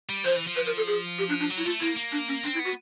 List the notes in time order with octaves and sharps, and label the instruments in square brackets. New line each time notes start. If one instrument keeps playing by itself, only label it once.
[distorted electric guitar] G3
[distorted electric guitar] F3 [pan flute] C5
[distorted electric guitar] E3
F3
[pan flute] B4
A#4
A4
G#4
G4
D4
D4
[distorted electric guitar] F#3
[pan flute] E4
[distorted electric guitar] A3 [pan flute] F4
[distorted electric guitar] A#3 [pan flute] E4
[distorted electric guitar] A#3
[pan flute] D4
C#4
[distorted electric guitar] C4 [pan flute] D4
[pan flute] E4
[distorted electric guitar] B3
[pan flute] F#4